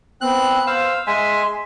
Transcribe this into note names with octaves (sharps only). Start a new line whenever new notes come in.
B3 C4 F#6
C5 F5 E6
G#3 E5 G#5 C6